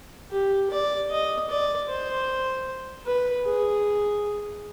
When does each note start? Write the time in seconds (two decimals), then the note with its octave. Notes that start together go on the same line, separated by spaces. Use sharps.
0.32 G4
0.70 D5
1.11 D#5
1.49 D5
1.89 C5
3.06 B4
3.46 G#4